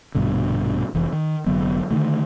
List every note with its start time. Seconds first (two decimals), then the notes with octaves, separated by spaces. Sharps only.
0.15 A#1 G2 B2 D3
0.95 F1 E3
1.13 D#3
1.46 F1 D3 F#3 B3
1.91 D3 D#3 A3